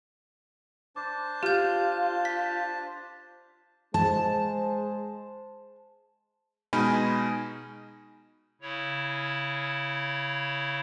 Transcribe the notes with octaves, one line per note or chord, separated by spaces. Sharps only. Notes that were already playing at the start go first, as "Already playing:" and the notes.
D4 C5 A5 D6
F4 G4 F6 G6
B6
G#3 G#4 C5 A5
B2 G#3 D#4 G#5 B5 F6
C#3 E4 C#5